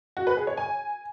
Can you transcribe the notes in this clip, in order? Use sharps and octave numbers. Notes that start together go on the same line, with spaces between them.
F#4
B4
G#4
C#5
G#5